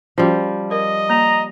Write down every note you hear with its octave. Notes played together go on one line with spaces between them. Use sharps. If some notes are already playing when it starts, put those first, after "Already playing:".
F3 G3 C#4 F4 F#4
A#4 D#5
A#3 A#5